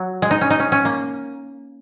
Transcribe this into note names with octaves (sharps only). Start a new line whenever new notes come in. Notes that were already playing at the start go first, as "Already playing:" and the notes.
Already playing: F#3
G#3
D#4
C#4
D#4
C#4
C#4
A#3